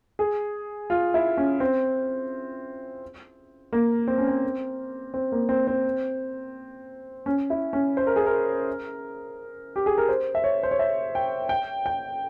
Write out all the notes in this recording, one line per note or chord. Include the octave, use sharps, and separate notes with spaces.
G#4
F4
E4
C#4
C4
A#3
C4
C#4
C4
C4
A#3
C4
C4
C#4
E4
C#4
C5
A#4
G#4
A#4
G4
G#4
A#4
C5
E5
C#5
C5
C#5
E5
G5
G5
G5